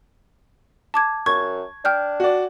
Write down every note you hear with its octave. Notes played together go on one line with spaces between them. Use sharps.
A5 D6 G#6
F#2 C#6 G#6
D4 G5 F6 G6
F#4 D5